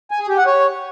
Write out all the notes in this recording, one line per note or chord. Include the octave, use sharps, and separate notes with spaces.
G#5
G#4
G4
F#5
C#5